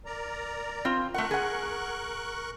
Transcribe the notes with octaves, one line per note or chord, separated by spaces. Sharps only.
A#4 D5 A#5
C4 F4
A3 A#4 F#5 C#6 F#6
G#4 F#5